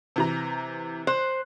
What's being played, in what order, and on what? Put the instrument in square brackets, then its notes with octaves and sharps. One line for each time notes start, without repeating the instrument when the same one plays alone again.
[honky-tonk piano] C3 E3 A#5
[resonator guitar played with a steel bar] C5 [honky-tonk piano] F#6